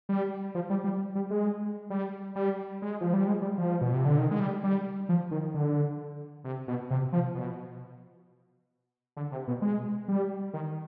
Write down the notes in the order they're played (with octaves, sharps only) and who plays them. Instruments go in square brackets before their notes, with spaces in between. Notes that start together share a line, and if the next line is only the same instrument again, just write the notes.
[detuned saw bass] G3
F3
G3
G3
G3
G#3
G3
G3
G#3
F3
G3
G#3
G3
F3
B2
C3
D3
D#3
G#3
G3
G3
F3
D#3
D3
C3
B2
C3
F3
B2
D3
C3
B2
G#3
G3
D#3